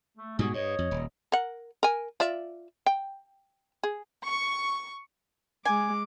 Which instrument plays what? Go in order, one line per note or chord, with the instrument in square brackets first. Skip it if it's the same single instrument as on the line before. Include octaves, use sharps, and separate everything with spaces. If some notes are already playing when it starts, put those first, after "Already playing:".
[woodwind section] A3
[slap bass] G#2 B2 G3 [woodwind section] B3 F#4 G#4
[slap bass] G2 [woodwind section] C#5 D#5
[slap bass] F2
D#1
[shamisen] A#4 F#5
A#4 G#5
F4 D5 E5
G5
G#4
[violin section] C#6
[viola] G#3 D6 [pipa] G#5